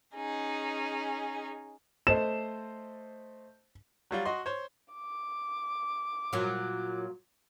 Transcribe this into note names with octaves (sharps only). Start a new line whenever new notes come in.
C#4 D#4 G#4
A3 C5 D#5 E7
F#3 G3 F4
F#4 D#5 C6
C5 C#5
D6
A#2 F#3